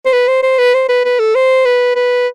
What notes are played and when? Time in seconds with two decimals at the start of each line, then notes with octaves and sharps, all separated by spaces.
0.06 C5
0.13 B4
0.28 C5
0.43 C5
0.58 B4
0.74 C5
0.89 B4
1.05 B4
1.19 A4
1.35 C5
1.65 B4
1.96 B4